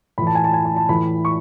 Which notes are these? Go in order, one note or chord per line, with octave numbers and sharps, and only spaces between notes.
A2 E3 B5
A5
G#5
A5
G#5
A5
A5
A2 E3 B5
C#6